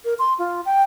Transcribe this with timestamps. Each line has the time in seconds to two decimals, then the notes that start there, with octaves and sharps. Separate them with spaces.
0.05 A#4
0.19 C6
0.39 F4
0.65 G5